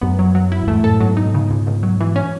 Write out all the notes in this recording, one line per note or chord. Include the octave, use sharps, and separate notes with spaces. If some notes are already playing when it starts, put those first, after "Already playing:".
F#2 B3
F#3
F#3
E4
F#2
E2 G#2 A3
F#2 A2 A4
G#2 B2 F#3
D#4
C#3
C#2
C#2
F#3
E3
C#4